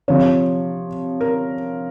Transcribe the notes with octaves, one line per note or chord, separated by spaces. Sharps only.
C3 F3 C#5
A#4